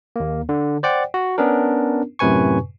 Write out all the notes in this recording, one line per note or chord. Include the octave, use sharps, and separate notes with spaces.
D#2 A#3
D3
C5 D5 F#5 G5
F#4
B3 C#4 D4 A#4
F#2 A2 C3 B4 G#5 C#6